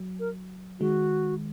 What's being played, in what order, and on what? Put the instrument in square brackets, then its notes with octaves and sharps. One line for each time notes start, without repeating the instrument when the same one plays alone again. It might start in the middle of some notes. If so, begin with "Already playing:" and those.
Already playing: [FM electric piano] F#3
[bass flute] A#4
[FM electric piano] D#3 G#3 [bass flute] F#4